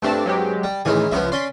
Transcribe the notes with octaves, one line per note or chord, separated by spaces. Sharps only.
G2 A3 C4 D4 A5
F#3 G#3 G4
G3
A2 D#3 E3 G#3 C#4 G#5
C#2 F3 B3 C#4 E4
C#4 D5 G#5 C6 B6